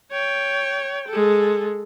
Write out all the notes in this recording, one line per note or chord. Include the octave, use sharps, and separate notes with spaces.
C#5 G5
G#3 A4